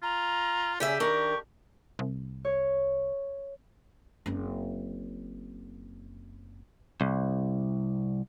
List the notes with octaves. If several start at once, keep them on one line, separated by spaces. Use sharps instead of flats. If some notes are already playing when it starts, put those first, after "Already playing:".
F4 A#5
C#3 G4 G#4 E5
D#3 D4 A#4 C#6
C2
C#5
F#1 C4
C2